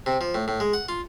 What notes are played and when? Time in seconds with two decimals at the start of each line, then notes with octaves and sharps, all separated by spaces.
0.06 C3
0.21 F3
0.35 A2
0.48 A2
0.60 G#3
0.73 F#5
0.89 F4